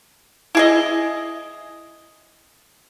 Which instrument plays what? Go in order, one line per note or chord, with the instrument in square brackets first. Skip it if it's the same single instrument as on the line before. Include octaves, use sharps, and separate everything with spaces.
[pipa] E4 G#4 D#5